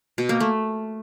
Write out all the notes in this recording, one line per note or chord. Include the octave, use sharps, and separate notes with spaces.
B2
A#3
A3